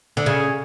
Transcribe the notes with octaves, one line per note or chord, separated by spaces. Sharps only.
D3
C#3